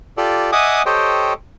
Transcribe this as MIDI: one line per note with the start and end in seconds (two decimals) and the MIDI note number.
0.17 0.51 65
0.17 0.51 67
0.17 0.51 69
0.17 0.51 74
0.52 0.82 75
0.52 0.82 76
0.52 0.82 78
0.52 0.82 80
0.52 0.82 86
0.52 0.82 87
0.86 1.33 67
0.86 1.33 69
0.86 1.33 72
0.86 1.33 73
0.86 1.33 75
0.86 1.33 79